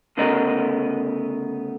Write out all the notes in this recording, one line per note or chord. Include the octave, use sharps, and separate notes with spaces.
D2 C#3 A3 B3 A#4 D#5